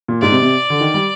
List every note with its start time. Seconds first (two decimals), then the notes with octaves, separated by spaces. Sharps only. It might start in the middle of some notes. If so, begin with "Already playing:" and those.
0.08 A#2
0.22 G#2 D5
0.32 C3
0.42 C3
0.70 D3
0.81 D#3
0.94 G3